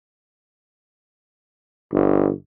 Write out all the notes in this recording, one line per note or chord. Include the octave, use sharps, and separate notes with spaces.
G1